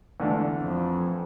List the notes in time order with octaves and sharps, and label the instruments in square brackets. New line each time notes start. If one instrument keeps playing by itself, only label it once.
[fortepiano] E2 D3 A3 D4
[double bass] F2